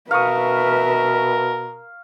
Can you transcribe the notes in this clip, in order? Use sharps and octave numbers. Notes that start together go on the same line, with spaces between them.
B2 A#4 B4 E5 F5 C#6 D#6